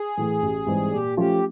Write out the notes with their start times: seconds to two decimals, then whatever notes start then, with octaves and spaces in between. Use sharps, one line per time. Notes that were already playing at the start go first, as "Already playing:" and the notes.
Already playing: G#4
0.17 A2 E3
0.42 A1
0.67 G#2 E3 G3 C4
0.92 A#2 G4
1.17 F3 A3 C#4 F4 G4